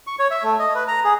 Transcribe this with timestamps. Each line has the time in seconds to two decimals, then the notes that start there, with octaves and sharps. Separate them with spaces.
0.07 C#6
0.19 C#5
0.31 E5
0.43 A3
0.59 D#5
0.75 B4
0.88 A#5
1.04 G#4